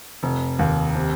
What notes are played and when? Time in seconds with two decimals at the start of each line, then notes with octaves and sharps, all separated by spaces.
0.23 F1
0.59 D#2
0.95 C3